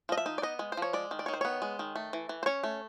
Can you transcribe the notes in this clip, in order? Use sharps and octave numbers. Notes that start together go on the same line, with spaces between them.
F3 D#5
E5
D#4
D5
B3 D#5
G#3
C5
F3 C#5
G#3 D5
D#3
D5
D#3 C#5
C5
B3 C#5
G#3
D#3
A3
E3
E3
C5
C#4 C#5
A3